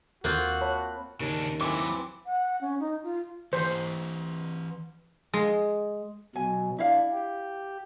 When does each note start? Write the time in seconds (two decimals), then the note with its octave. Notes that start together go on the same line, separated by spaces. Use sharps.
0.24 D#2 A#3 C4 F4 F#4 F#6
0.61 C#5 A5 B5
1.20 D#2 C#3 D4
1.61 E3 F#3 C4 E4 D6
2.26 F#5
2.61 C#4
2.79 D#4
3.03 F4
3.53 E3 G4 C5
5.33 G#3
6.36 B2 F#3 G#5
6.79 D4 E4 F5
7.12 G4